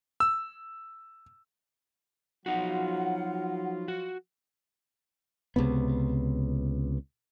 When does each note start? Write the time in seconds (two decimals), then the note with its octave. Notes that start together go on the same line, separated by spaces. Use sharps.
0.20 E6
2.46 F3 F#3 D#4 F4 F#4 F#5
3.88 F#4
5.56 C#2 C3 B3